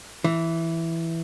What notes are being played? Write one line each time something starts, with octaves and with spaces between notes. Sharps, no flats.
E3